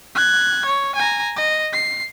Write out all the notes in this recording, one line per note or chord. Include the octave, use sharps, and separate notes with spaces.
F#6 G#6
C#5
G#5 A#5
D#5
C7